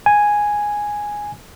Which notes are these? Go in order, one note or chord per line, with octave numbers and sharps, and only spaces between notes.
G#5